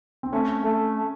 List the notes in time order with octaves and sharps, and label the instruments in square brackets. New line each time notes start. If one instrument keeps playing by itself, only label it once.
[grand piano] C4
[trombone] A3 [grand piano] C#4
[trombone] A3